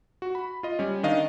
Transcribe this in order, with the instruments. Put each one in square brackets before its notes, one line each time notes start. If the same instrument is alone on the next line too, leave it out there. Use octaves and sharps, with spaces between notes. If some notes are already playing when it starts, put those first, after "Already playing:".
[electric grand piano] F#4
B5
F4 D#5
G3 C#4
D#3 D4 D#5 F5